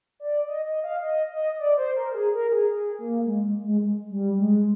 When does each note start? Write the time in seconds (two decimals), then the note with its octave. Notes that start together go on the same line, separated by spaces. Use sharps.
0.20 D5
0.48 D#5
0.66 D#5
0.84 F5
1.03 D#5
1.31 D#5
1.59 D5
1.77 C5
1.96 A#4
2.14 G#4
2.34 A#4
2.52 G#4
2.71 G#4
2.99 A#3
3.26 G#3
3.64 G#3
4.10 G3
4.39 G#3